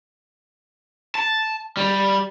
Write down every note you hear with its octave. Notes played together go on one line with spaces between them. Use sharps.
A5
G3